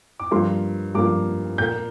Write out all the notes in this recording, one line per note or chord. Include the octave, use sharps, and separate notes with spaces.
D6
G2 F3 A#3 C6
G2 F3 A#3 D6
A#2 A#3 G6